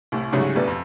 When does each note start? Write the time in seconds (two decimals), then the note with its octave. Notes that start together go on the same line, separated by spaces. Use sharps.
0.12 C2 A2
0.33 G#2 C#3 F#3 G3 A3
0.55 A1 G2 B2 B3 D4 A4
0.67 F2